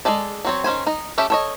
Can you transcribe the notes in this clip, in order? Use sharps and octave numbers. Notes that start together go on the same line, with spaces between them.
G#3 E4 G#4 A4 D5
F#3 C4 C#5
D#3 C#4 C5 G#5
D#4 D#5
C#4 G4 A4 E5
A4 C#5 D#5